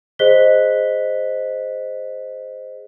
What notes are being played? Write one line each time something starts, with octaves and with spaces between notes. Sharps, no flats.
G#4 C5 D#5 F#6 B6 G7